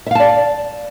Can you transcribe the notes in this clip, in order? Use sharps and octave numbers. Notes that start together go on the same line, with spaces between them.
D5 E5 F5 A5